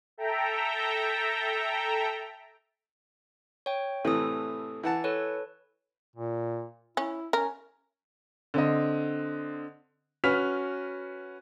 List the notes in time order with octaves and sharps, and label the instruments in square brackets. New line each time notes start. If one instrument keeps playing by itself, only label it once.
[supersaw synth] A4 E5 G5 A#5
[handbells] C#5 G5
[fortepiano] A2 C3 E3 [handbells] A4 D#6
[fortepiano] E3 F#5 A5
[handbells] A4 B4 C#5
[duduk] A#2
[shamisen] C#4 [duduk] E4
[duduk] C#4 [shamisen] A#4
[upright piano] D3 C4 D#5
C#4 F#4 B4 F6 B6 F7